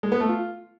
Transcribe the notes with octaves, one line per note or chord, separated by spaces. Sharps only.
G#3
B3
A3
F4